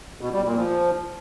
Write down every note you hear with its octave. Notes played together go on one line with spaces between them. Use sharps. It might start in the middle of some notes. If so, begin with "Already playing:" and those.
B2
G3
A#2
F3